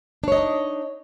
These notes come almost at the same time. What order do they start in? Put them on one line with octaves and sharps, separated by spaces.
D4 C#5 D#5 D#4